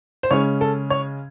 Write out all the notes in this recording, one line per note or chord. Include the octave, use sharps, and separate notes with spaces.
C5
C#3 G#3 C#4 C#5
A4
C#5